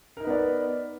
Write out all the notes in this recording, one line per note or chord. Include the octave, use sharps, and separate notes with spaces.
B3 D#4 A#4 B4 D5